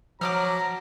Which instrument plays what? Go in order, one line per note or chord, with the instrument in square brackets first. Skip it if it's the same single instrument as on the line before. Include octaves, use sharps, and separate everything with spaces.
[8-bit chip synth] F3 [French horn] F#3 [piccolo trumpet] A#5 [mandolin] D6 D#6 F6